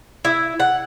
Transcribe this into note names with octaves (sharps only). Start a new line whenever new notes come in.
E4
F#5